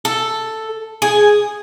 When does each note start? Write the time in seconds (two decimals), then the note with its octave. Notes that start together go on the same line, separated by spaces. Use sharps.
0.05 A4
1.02 G#4